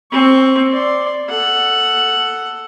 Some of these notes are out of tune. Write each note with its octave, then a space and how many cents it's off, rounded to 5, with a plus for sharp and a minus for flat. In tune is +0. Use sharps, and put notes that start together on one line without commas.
C4 +15 C#6 +15
D5 +0 C6 +0
A4 +5 F#5 +0